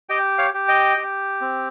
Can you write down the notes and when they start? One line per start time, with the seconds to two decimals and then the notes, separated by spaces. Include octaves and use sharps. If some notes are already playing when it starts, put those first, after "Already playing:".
0.09 G4 D#5 G5
0.38 C#5 F5
0.54 G4
0.68 D#5 G5
0.97 G4
1.41 C4